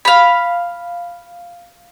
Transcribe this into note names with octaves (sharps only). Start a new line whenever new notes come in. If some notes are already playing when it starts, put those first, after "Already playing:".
F5 B5